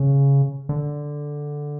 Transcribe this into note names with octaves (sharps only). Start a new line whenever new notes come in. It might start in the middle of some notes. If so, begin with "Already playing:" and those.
Already playing: C#3
D3